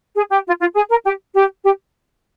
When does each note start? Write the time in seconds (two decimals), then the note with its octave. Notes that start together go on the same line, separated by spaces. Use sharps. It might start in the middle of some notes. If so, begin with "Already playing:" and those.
0.15 G#4
0.30 G4
0.45 F4
0.60 F4
0.74 G#4
0.89 A#4
1.04 G4
1.33 G4
1.63 G4